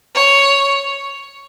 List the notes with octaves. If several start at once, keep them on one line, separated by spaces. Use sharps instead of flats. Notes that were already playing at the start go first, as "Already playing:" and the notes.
C#5